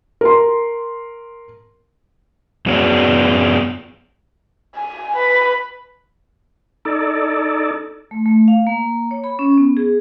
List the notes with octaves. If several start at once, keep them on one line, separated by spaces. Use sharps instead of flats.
A#4 C6
F#2 F#3 B3 G#4 C#5 D5
G#5
B4
D#4 A4 D5
A3
A3
F5
A#3
C#5
B5
C#4
B3
G#4